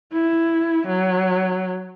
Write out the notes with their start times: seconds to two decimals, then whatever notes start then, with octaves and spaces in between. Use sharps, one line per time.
0.13 E4
0.87 F#3